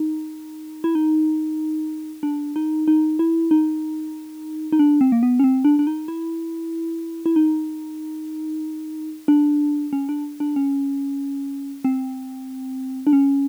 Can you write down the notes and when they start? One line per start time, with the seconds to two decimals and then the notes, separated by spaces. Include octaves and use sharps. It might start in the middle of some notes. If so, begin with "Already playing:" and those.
Already playing: D#4
0.84 E4
0.95 D#4
2.23 D4
2.56 D#4
2.88 D#4
3.19 E4
3.51 D#4
4.72 D#4
4.79 D4
5.01 C4
5.12 A#3
5.23 B3
5.39 C#4
5.44 C4
5.65 D4
5.79 D4
5.87 D#4
6.08 E4
7.26 E4
7.36 D#4
9.28 D4
9.93 C#4
10.09 D4
10.40 D4
10.56 C#4
11.85 C4
13.07 D4
13.13 C#4